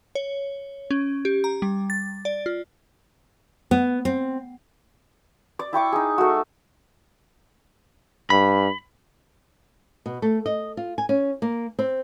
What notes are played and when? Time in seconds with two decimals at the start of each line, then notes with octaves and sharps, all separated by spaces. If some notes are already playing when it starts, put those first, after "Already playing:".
0.15 C#5
0.91 C#4
1.25 G4
1.44 A#5
1.62 G3
1.90 A6
2.25 D5
2.46 F4
3.71 B3
4.05 C4
5.59 D5
5.73 E4 G5 C#6 D6
5.92 D#4 G#4
6.18 A3 F#4
8.30 G2 B5
10.06 B2
10.22 A3
10.46 D#5
10.77 F4
10.98 G#5
11.09 C#4
11.42 A#3
11.79 C4